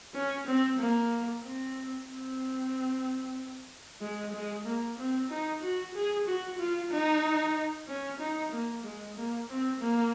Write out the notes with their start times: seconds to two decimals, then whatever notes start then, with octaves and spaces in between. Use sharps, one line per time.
0.14 C#4
0.46 C4
0.79 A#3
1.43 C4
2.08 C4
4.01 G#3
4.33 G#3
4.65 A#3
4.98 C4
5.30 D#4
5.62 F#4
5.94 G#4
6.26 F#4
6.59 F4
6.91 D#4
7.87 C#4
8.20 D#4
8.52 A#3
8.84 G#3
9.16 A#3
9.49 C4
9.80 A#3